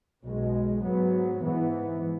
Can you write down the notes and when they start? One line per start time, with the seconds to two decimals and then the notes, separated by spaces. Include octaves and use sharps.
0.23 B1 B2 G#3
0.83 G#2 F#3 B3
1.42 G#2 E3 B3